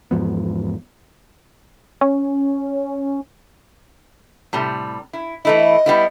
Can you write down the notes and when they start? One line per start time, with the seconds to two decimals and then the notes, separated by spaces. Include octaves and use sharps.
0.11 E2 G#2 F3 B3
2.01 C#4
4.53 A2 C3 G3
5.13 E4
5.45 E3 A3 E4 D#5
5.86 G3 B3 E4